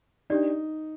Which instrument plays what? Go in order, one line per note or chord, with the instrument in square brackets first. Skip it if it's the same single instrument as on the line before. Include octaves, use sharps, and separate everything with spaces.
[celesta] D4 G4 D5 [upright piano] D#4